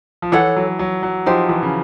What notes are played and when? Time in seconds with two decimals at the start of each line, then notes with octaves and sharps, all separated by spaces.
0.22 F3
0.32 E3 A4 C#5 F#5
0.56 F#3
0.79 F#3
1.03 F#3
1.26 F3 D#4 G4 C5
1.49 E3
1.63 C#3